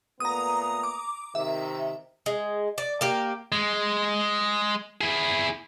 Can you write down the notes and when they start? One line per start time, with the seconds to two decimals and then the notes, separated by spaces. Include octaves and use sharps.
0.20 A#2 A3 B3 A#5 D#6
0.83 D6
1.35 C3 D#3 E5
2.26 G#3
2.78 D5
3.01 A#3 G4
3.52 G#3
5.01 E4 G#4